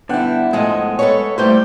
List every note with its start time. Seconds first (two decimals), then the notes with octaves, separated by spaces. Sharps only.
0.09 D3 G3 B3 E4 F#5 G5
0.53 A2 F3 G#3 A4 D#5
0.99 A4 B4 C#5
1.38 A2 G3 A3 A#3 G4 C5 G6